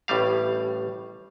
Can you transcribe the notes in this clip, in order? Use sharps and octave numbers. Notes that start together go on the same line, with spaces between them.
A1 A2 G3 F5